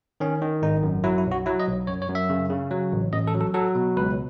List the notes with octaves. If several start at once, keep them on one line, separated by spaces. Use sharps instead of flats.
D#3 C#4
D#3
G#1 D#4
F#2
F#3 E4
E4
B1
F#4
F#3 E4
D#5
B1
F#2 C#5
C#5
F#2
E5
C#3
C#3
F#3
A1
A1 D#5
A4
F#3
A4
F#3 A4
B2
C#2 B4